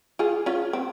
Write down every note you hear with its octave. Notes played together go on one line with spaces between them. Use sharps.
F4 G#4
C#4 F4
C4